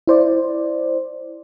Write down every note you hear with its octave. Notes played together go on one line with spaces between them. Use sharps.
E4 C5 D5